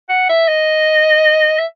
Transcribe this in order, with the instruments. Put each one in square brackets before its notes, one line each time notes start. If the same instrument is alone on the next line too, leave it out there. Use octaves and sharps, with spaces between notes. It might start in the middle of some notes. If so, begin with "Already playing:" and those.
[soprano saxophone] F#5
E5
D#5
E5